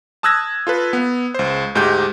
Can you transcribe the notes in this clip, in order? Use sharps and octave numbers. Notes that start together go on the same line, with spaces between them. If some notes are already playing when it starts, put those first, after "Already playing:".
A5 D#6 E6 F#6 G#6 A#6
F4 A4 B4
B3
C#2 C5
D2 G#2 D#4 G4 G6